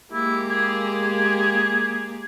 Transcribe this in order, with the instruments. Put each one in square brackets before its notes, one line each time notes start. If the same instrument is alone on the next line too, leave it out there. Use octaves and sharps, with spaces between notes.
[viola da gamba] G#3 A#3 G4 [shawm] E4
[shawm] G#4